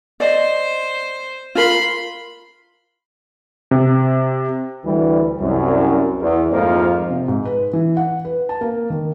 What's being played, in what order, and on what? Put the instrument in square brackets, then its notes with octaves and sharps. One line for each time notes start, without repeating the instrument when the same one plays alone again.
[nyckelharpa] C5 [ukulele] D5 D#5
[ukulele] F4 A#4 [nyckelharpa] B5 C6
[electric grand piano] C3
[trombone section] D2 E3 G3
C2 F#2
E2
F2 G#2 F3 A3 A#3
[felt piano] C3
G#2
B4
E3
F#5
B4
A5
A#3
D#3